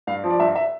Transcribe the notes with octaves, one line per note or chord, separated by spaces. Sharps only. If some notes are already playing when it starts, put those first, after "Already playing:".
G2 F5
F3
D5
G2 E5
E5